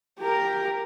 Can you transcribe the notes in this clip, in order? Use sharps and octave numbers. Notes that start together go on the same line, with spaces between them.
G4 A#4